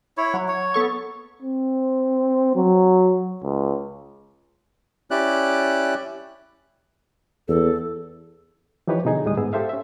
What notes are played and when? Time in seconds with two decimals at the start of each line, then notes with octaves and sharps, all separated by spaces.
0.17 E4 C#5
0.34 F#3
0.48 C#5
0.74 B3 A4 C#6
1.42 C4
2.56 F#3
3.43 C#2
5.11 C#4 E4 G4 D5 F#6
7.48 E2 A4
8.87 E3 F3 D#4 G4 B4 C#5
9.05 B2 D3 D#4 G#4
9.24 D2 A2 G3 G#3 D#6
9.37 G#2 B3 G#4 E6
9.53 G4 A4 C5 E5 F5
9.69 C#4 E5